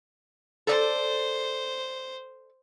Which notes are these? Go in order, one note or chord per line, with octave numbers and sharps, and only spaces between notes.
A4 C5 D5